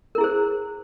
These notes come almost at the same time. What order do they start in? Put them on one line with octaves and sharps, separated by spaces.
A#4 E4 G#4 C5